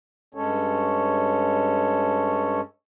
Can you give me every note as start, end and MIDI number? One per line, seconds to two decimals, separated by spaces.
0.35 2.61 43
0.35 2.61 56
0.35 2.61 61
0.35 2.61 69
0.35 2.61 73